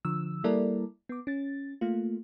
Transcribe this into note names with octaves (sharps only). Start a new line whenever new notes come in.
D3 F3 E6
G3 A#3 E4 A4 A#4 D5
B3 D6
C#4 A6
A3 A#3 F4